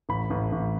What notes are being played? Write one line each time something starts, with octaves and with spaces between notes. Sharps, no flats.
A1 B5
A1
A1